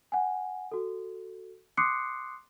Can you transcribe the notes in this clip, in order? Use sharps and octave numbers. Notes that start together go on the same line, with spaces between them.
F#5 G#5
F#4 A4
C6 D6 D#6 F#6 C7 C#7